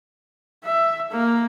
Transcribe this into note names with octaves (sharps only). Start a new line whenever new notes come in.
E5
A#3